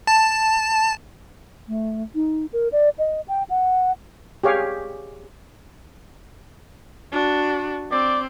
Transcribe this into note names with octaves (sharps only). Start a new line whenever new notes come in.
A5
A3
D#4
A#4
D5
D#5
G5
F#5
G4 G#4 C#5 F5
D4 F#4
C4 D5